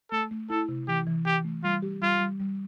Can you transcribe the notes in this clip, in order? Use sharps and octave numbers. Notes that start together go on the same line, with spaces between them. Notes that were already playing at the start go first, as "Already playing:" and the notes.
A3 A4
A3
E4 A4
C3
E3 G4
E3
E3 G4
A3
G3 F4
G4
G3 F4
G3
G3